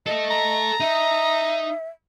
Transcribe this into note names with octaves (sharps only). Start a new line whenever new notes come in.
A4 D#5 E5
A#5
D#4 E5